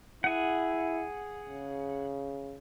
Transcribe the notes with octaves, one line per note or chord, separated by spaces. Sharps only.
E4 G#4 F#5
C#3